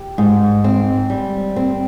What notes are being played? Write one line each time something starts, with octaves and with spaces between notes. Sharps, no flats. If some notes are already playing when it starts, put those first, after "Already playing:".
Already playing: G4
G#2
C4
G3
C4